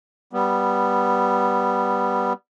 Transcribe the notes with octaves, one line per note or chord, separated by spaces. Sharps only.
G3 B3